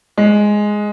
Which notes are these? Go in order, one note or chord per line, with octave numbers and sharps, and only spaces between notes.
G#3